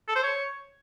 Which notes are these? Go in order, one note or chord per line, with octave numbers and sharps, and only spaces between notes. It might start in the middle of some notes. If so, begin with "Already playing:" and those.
A4
C5
C#5